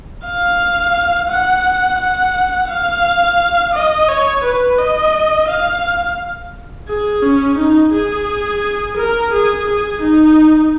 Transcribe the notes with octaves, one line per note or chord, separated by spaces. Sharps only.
F5
F#5
F#5
F5
D#5
C#5
B4
D#5
F5
G#4
C#4
D#4
G#4
A#4
G#4
G#4
D#4